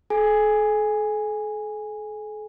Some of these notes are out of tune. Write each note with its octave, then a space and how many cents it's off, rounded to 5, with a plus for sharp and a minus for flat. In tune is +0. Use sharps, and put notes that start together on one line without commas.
A4 -45 G#5 -10